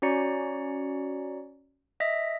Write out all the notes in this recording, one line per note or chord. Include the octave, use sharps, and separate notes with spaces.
C#4 F#4 C#5 D5 A#5 C#7
D#5 E5 A#6 B6